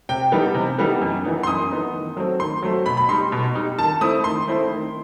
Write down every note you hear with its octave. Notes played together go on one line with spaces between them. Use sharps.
C3 G5
E3 G3 B3 D#4
C3
E3 G3 B3 D#4
F#2
E3 B3 D#4
C6
F#2 D#6
E3 B3 D#4
D#3
F#3 A3 C4
D#3 C6
F#3 A3 C4
B2 B5
B5
G3 D#4 C6
B2
G3 D#4
D#3 A5
A3 C4 E4 D#6
D#3 C6
A3 C4 E4
D#3